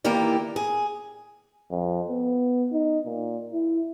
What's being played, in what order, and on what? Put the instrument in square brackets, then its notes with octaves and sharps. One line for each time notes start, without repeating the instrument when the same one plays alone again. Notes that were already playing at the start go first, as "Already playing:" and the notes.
[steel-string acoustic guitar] D#3 E3 A#3 E4 G4 D5
G#4
[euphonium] F2
B3
D#4
A#2
E4